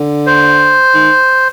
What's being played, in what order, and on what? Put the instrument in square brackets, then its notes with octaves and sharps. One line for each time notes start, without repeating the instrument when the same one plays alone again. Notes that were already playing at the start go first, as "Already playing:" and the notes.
Already playing: [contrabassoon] D3
[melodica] C5
[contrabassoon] D#3